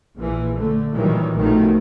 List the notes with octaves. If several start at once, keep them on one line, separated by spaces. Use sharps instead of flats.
A#1 A#2 E3
D3 A3
A#2 D#3 E3 F#3 G3
A#1 B2 D#3 F3 A3